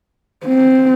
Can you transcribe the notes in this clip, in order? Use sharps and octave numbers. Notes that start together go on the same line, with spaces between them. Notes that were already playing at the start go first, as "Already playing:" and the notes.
C4